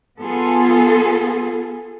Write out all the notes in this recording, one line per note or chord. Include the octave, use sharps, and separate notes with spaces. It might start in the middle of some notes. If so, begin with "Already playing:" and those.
B3 F4 G#4 A4